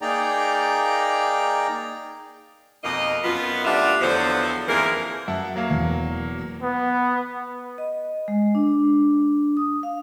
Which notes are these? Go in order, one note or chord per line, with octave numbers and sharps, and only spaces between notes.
A#3 D#4 G#4 D5 G5 A#5
F2 B2 A#3 D#5
F#2 B3 F4
D2 D4 F4 G4 E5 F#5
E2 D3 F3 F#3 B3 C5
F2 G#2 E3 A#3 G#4 A#4
F#2 E5 F#5 A5
F#3 A#3 F5
E1 E2
B3
D#5
G#3
D4
D#6
F5